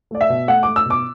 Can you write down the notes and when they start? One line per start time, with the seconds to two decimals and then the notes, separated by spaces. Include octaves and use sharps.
0.11 A3 D5
0.21 E5
0.29 B2
0.48 A3 F#5
0.63 A3 D6
0.76 E6
0.85 B2 D6